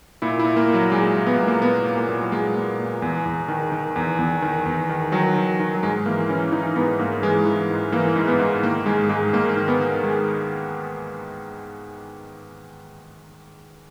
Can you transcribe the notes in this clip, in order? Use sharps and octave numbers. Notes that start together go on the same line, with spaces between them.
A#2 E4
E4
A#2
A#3
A#2
F#3
A#2 G#3
A#2
B3
A#3
A#2 G#3
A#3
A#2 B3
A#2
A#3
A#2
F#3
A#2 G#3
A#2
A#2
E2
E2
D#3
D#3
E2
E2
D#3
E2
D#3
D#3 F#3
D#3
D#3
F#3
G#2 G#3
E3 A#3
E3 C#4
E3 D#4
G#2 B3
G#2 A#3
E3 G#3
E3
G#2
E3 A#3
G#2
B3
G#2
D#3 A#3
G#2 G#3
G#2 G#3
G#2 A#3
D#3
B3
D#3
D#3 G#3